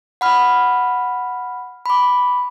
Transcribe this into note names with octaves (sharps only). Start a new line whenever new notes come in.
F#5 B5 F6
B5 D6